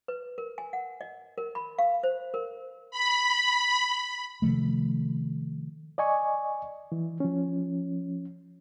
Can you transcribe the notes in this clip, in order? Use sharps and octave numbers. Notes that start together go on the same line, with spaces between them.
B4
A#4
G#5
F#5
D#5
A#4
B5
F5
C5
A#4
B5
C3 D#3 F3 A3
D5 D#5 G#5 C#6
E3
F3 C#4